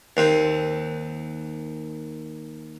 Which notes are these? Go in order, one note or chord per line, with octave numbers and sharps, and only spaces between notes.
D#2 C4